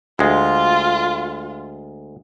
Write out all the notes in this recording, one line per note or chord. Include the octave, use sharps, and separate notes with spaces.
D2 G#3 F4